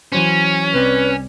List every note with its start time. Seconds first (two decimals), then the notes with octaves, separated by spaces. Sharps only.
0.12 E3 F#3 C#4 C5
0.74 C2 C4 B4 D5